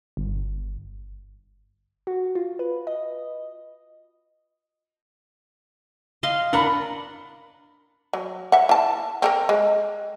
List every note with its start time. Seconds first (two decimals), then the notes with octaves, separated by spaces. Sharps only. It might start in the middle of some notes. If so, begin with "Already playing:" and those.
0.17 G1
2.07 F#4
2.35 F4
2.59 B4
2.87 D#5
6.23 D#5 F5 C6
6.53 D4 A#4 F#5 A#5 B5
8.13 F#3
8.52 E5 F#5
8.69 E4 A5
9.22 C4 A4 A#4
9.49 G#3